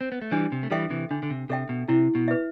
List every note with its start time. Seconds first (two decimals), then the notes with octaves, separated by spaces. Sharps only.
0.01 C4
0.12 B3
0.22 A3
0.31 E3 G3 D4
0.52 C3
0.63 A3
0.71 E3 G3 A4 E5 G5
0.90 C3 E3
1.11 D3 D4
1.23 D3
1.30 C3
1.49 C3 A4 E5 G5
1.69 B2
1.88 C3 E4
2.15 B2
2.28 B4 E5